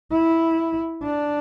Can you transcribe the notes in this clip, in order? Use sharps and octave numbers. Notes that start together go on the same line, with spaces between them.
E4
D4